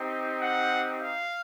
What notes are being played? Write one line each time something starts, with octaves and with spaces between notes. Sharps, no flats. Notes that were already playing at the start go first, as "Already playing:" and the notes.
Already playing: C4 D#4 G4
F#5
F5